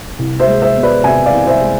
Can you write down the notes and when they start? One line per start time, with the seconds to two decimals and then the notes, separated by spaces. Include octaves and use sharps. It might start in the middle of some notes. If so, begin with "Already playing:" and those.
0.19 C2
0.40 C5 E5
0.47 G#3
0.62 C5 E5
0.76 B3
0.83 B4 D5
1.04 C3 E5 G#5
1.26 D5 F5
1.33 C2
1.47 C5 E5
1.61 G#3